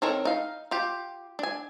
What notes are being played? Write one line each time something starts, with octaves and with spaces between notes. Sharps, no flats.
D#3 C4 A4 A#4 C#5
D#4 F5
F4 G4
D4 G#5